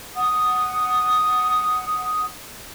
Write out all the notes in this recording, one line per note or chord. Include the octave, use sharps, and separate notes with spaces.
F#5 D#6